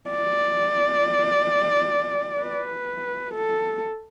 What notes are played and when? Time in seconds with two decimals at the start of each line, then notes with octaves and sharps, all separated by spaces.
0.10 D5
2.41 B4
3.34 A4